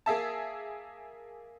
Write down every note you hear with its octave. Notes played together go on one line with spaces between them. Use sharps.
A#3 G#4 E5 A5